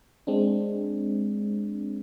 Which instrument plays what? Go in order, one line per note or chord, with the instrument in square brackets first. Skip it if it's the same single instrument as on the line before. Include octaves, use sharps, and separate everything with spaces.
[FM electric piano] G#3 C4 D4